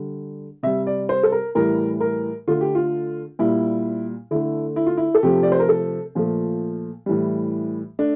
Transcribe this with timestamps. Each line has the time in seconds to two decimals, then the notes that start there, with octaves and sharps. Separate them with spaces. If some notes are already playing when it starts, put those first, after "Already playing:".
Already playing: D3 G3
0.63 C3 G3 E5
0.87 D5
1.09 C5
1.23 A4
1.32 A#4
1.55 A2 E3 G3 A#4
2.00 A#4
2.48 D3 A3 F4
2.61 G4
2.75 F4
3.39 A#2 G3 E4
4.31 D3 A3 E4
4.76 E4
4.87 F4
4.97 E4
5.15 A4
5.23 C3 F3 A3 G4
5.43 D5
5.52 C5
5.59 A#4
5.69 A4
6.15 A#2 F3 A3
7.06 A2 E3 G3
7.99 A3 D4